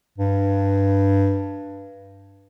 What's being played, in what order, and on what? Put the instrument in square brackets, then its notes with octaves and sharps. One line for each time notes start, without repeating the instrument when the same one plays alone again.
[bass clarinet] G2